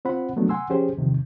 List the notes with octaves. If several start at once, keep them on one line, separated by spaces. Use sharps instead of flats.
C4 F4 C5 F#5 B5
F3 F#3 G#3 A3 B3 D4
F#5 G#5 C6 E6
F3 C#4 G4 G#4 C5
E2 C3 D#3 F3